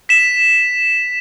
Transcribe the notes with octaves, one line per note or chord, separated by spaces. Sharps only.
B6 E7